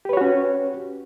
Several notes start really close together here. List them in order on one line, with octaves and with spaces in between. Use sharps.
G4 B4 C#5 F#4 C#4